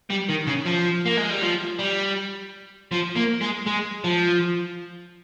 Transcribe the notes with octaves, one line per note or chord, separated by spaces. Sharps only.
G3
D#3
C#3
F3
A#3
G#3
G3
F3
G3
F3
A#3
G#3
G#3
F3